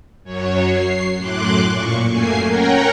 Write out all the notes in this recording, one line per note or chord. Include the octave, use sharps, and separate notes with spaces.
F#2 F#3 C#5
C7
F#2 A2 C6 D6 F#6
A#2 C#6
F#2 A3 A#3 G#5 C7
C#4 A#4 C#5 F#5 G5 A#5